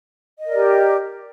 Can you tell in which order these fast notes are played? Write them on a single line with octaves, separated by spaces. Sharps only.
D#5 A#4 D5 G4